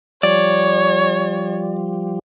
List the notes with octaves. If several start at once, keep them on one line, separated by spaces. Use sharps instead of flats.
F3 G3 C#5 D5